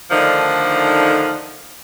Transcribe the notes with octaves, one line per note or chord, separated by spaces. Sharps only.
D3 D#3 F3 A3 D4 D#4